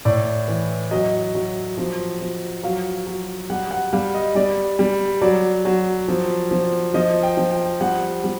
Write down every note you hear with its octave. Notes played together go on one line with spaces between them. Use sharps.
A2 D5
E3
F#3 D#5
F#3
F3
F3
F#3 F5
F#3
G3 F#5
F#5
G3 F5
D#5
G3 D5
G3
F#3 D5
F#3
F3
F3
F3 D#5
G5
F3
G5
G3 F#5
G3